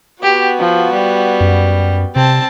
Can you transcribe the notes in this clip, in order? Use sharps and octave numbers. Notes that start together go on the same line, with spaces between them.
B3 F#4 G4
F3
G3
F#2
C3 C4 A5